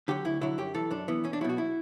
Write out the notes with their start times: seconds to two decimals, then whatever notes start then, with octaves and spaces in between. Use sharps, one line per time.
0.08 D3 F#3 G4
0.25 D2 E4
0.41 D3 F#3 E4
0.58 F#2 G4
0.75 E3 A4
0.91 F#2 D4
1.08 E3 B3
1.24 E2 C#4
1.33 D4
1.41 F#3 E4
1.44 B2 F#4
1.58 E4